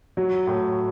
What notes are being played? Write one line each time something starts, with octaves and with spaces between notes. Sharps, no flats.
F#3
A2